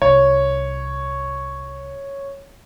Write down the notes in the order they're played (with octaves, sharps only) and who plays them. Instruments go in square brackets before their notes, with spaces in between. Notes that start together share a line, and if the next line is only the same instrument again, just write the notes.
[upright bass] C2 [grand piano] C#5